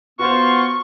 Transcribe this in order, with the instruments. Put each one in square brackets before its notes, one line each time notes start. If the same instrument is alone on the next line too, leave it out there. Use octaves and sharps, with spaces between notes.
[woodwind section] B3 F4 [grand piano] F#4 C5 [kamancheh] C#6